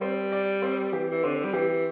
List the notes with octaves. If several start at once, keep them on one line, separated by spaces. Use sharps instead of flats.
G3 C4
D5
C4
E3 G4
E3
D3 C4
G3
E3 G4